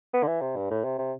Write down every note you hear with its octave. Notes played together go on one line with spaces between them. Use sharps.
B3
D3
E3
C3
G2
A2
C3
C3